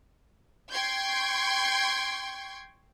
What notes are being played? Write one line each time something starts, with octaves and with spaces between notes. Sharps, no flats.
G5 C6 C#6 G6 G#6